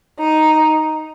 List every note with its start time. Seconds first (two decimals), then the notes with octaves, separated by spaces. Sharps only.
0.19 D#4